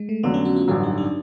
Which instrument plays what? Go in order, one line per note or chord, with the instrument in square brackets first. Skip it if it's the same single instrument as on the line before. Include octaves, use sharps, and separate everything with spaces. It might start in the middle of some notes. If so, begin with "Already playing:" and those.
Already playing: [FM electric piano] G#3
A3
[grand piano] F2 D3 F#3 [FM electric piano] B3
[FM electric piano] C#4
F#4
F4
[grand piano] A1 G2 D3 F#3 [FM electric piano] F4
[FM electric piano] D#4
D4